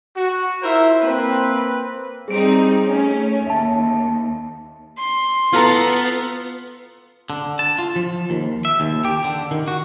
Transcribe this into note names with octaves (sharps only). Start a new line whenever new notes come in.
F#4
E4 F4 A#4 C5 E5
A#3 C4 B4
G3 C4 D#4 G#4 D7
A3 C#4
D#2 E5 A5
C6
B3 F4 A4 A#5
D3
A5
F4
F3
D#2
E5
D#2
G4
D3
D#3
F#4